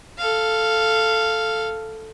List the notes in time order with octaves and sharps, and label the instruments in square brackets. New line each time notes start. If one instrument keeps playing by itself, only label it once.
[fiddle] A4 F5